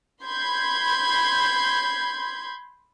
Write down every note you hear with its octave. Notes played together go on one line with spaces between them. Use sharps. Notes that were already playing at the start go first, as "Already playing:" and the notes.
B5 C6 G6 G#6